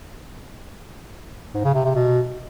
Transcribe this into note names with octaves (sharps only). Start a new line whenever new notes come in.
G#2
C#3
C3
C3
B2